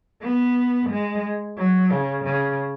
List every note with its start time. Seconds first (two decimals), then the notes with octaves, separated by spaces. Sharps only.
0.23 B3
0.90 G#3
1.58 F#3
1.91 C#3
2.24 C#3